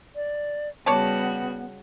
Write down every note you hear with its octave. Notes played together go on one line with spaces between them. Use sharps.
D5
C#3 G3 B3 F#4 C#5 D5 A5